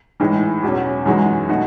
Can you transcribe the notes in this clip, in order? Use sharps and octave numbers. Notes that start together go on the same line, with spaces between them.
A2 E3 G#3 D#4
E2 B2 F#3 C#4
F#2 E3 G#3 D#4 F#4
B2 A3 D#4 F#4